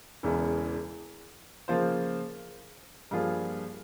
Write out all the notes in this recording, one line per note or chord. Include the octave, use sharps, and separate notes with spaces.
E1 E2 C#3 E3
C#3 F3 A#3 F4 C5
G2 F3 A#3 F4 G#4